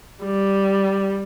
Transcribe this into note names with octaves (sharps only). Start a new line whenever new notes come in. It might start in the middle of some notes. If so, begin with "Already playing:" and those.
G3